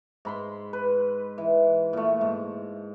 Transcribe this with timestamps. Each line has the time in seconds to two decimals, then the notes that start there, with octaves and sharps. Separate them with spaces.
0.25 G#2 B5 C6
0.73 B4
1.38 E3
1.93 A#2 A3
2.21 G#2